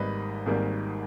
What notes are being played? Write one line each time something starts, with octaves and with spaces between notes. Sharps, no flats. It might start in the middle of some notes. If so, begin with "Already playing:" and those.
Already playing: G#1 G#2 D#3 G3 A#3 B4 D#5
G#1 G#2 D#3 G3 A#3